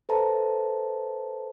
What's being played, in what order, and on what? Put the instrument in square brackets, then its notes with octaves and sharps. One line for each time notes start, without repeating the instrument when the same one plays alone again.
[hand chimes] A4 B4 C5 E5 A5 A#5